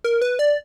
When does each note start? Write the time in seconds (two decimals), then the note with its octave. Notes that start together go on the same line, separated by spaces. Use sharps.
0.04 A#4
0.22 B4
0.39 D5